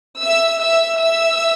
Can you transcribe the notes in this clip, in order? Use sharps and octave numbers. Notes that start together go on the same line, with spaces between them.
E5 E6
E5 E6
E5 E6